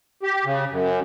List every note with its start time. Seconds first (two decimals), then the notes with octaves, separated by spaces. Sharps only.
0.23 G4
0.45 C#3
0.71 F#2